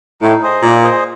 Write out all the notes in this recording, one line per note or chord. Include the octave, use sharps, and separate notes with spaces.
A2 D#4
G#4 C5 D#5
A#2 D#4
G#4 C5 D#5